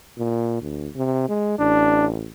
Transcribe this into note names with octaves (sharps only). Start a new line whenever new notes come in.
A#2
D2
C3
G#3
A1 D4